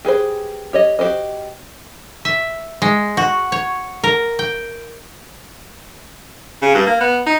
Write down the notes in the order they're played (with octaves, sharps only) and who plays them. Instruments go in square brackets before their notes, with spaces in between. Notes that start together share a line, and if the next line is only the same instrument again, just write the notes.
[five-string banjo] G4 G#4 B4 C5
G4 C#5 D#5
F#4 G4 C5 D#5
[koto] E5
G#3
F#4
C#5
A#4
G5
[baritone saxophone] C#3
G2
A#3
B3
D#4